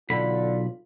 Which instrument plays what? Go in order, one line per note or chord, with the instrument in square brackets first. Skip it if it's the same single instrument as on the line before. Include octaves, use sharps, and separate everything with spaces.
[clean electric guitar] B1 B5 [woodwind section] D3 [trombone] F4